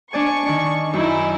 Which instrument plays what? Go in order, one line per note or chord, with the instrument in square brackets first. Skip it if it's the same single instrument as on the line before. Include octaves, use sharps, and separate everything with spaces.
[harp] D4 D5 G#5 [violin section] C#6
[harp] D#3 D4
[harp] F#2 [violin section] D#4 E4